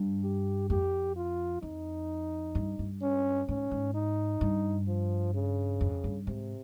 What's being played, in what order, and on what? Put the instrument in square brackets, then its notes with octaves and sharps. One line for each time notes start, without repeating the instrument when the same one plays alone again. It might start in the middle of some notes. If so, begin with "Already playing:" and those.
Already playing: [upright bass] G2
[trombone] G4
[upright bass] F2 [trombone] G4
[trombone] F4
[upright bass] F2 [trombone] D#4
[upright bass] G2
G2
[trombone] C#4
[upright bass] G#2 [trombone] C#4
[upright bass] G#2
[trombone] D#4
[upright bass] G2
[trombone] F3
C#3
[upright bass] F2
G2
[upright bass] G#2 [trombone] C3